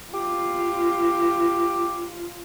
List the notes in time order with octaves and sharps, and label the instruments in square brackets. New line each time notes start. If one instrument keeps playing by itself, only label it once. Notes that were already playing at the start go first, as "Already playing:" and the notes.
[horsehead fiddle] F4 [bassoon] G4